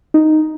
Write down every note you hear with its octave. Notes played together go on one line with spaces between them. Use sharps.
D#4